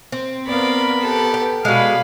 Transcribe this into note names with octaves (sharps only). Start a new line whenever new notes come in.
C4
B3 A#4 D5 F5 B5
G4 A4
G5
B2 G#3 D5 F5 B5